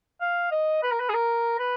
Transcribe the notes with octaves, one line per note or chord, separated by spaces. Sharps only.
F5
D#5
B4
A#4
B4
G#4
A#4
B4